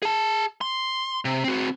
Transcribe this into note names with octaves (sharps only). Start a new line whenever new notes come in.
G#4 A5
C6
C3
C4 F#4